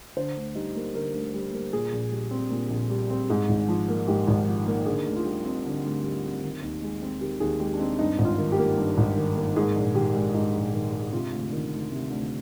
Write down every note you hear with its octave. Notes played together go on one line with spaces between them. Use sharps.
D3 C5
D2
G3 D#4
A#3
D3 A#4
D2
G3
A#3
A#2 G#4
A#1
G3
C4
A#2
A#1
G3
C4
G#2 G#4
G#1
F3
A#3
G#2 G4
G#1
F3
A#3
D3 G#4
D2
F4
G3 G4
C4
D3
D2
G3
C4
D#3
D#2
G#3
C4
D#3 G4
D#2 G#4
G#3 G4
D4
C4 D#4
G2 D#4
G#1
F4
D#3
G4
A#3
G2
G#1
D#3
A#3
G#2 G#4
A#1
D#3 G4
G#3
G#2 D#4
A#1
D#3
G#3
C3 F4
D2
D#3
D2
C3
D2